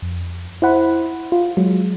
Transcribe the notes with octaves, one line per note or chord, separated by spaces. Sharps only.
F2
E4 C5 F#5 B5
F4
F#3 G#3